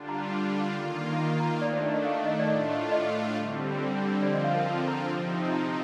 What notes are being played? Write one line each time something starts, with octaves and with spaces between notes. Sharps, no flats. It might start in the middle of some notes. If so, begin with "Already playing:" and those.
Already playing: D3 G3 D4 F4
A#5
D#3 A#3 F4
A#5
A#5
D#3 A3 D4 D5
C5
D5
D#5
F5
D#5
D5
A2 A3 D4 F4 D#5
D#5
D#5
D3 G3 C4
D3 F3 C4 F4 D5
D#5
F5
A#4
A5
A#5
C3 F3 C4 D#4
A5
A#5